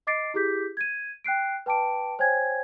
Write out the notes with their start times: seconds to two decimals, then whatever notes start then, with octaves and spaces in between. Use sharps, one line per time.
0.07 D#5 D6 A6 C7 D7
0.34 E4 G4 G#4 D6 G6 B6
0.77 G#6 D#7
1.24 G5 F#6 C7 D7
1.66 B4 G5 A5 D6 D7
2.19 C5 C#5 G5 G#5 G#6